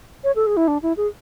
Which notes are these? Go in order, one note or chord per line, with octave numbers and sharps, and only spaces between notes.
C#5
A4
G#4
E4
D4
E4
G#4